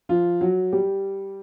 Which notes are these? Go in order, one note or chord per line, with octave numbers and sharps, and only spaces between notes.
F3 F4
F#3 F#4
G3 G4